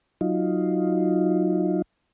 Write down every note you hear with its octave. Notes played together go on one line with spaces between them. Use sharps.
F#3 D#4 F4